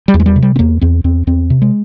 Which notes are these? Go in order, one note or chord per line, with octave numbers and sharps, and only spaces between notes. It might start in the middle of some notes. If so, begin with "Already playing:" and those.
G3
E2
G#3
G3
C3
G3
C4
E2 A#3
E2 C4
E2 C4
E2 C4
C3
G#3